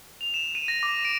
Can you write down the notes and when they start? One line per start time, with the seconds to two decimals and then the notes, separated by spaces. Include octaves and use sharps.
0.21 F7
0.34 E7
0.55 D#7
0.68 A#6
0.83 D6
1.05 D7